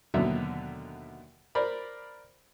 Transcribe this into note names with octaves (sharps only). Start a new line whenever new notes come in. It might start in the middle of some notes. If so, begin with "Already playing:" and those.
D#2 B2 D3 F#3 E5
A#4 C5 D5 B5